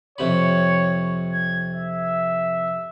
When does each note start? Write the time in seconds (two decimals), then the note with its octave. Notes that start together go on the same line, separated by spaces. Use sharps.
0.18 F2 C3 C#5 B5
1.33 G#6
1.72 E5